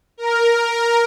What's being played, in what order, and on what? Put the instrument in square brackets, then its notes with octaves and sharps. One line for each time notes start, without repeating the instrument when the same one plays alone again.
[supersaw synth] A#4